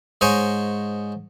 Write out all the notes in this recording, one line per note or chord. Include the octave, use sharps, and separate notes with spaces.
G#2 C5 C#5 D#5 G#5